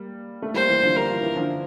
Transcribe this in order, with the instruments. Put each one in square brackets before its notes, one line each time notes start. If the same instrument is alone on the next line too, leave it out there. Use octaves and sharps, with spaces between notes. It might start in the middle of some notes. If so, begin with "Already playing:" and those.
Already playing: [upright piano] G3 A#3
A3
[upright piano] G3 A#3 [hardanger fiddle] C5
[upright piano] E3 G3
D3 F3
[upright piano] G3 [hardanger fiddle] A#4
[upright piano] F3
E3
D3 F3